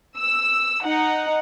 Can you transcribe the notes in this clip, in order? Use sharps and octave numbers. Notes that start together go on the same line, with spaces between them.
E6
D#4 F#5